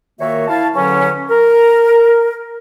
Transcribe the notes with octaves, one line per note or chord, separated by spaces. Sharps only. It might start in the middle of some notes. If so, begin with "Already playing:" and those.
A#2 D#3 A#3 F#4 C#5 E5
E4 F5 A5
E2 D3 F#3 C#4
A#4